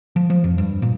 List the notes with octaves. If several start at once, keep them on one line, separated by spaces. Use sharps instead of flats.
F3
F3
F2
G2
A#2